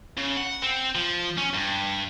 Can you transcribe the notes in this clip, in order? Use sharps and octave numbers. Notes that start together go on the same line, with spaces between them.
C#3
F#5
C4
F3
C#4
G2